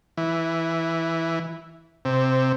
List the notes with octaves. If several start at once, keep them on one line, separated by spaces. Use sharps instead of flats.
E3
C3